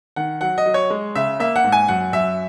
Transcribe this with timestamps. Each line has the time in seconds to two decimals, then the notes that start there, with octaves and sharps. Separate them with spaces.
0.16 D#3 F#5
0.41 F#3 F#5
0.58 D#5
0.66 F#3
0.74 C#5
0.90 G#3
1.15 C#3 E5
1.40 A#3 E5
1.56 F#5
1.64 G#2
1.72 G#5
1.88 F#2 F#5
2.13 F#2 E5